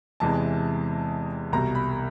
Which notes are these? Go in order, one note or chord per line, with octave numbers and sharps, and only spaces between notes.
E2 C3 E3 G#3 A5
C2 B2 G3 A#5
B5